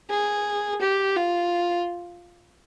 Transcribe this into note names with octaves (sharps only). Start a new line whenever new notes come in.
G#4
G4
F4